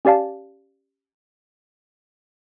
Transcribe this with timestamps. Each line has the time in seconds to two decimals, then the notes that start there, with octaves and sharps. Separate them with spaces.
0.05 C#4 G4 D5 F5 A5